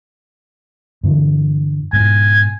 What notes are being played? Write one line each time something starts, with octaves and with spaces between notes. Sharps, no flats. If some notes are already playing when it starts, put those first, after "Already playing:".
G2 D3 E3
G#2 B2 G#5